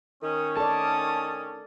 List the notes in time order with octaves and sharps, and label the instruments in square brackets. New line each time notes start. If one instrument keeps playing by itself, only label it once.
[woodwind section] D#3 C#4 [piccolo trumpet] D#6
[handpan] A4 D5 [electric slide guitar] A5 [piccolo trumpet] D#6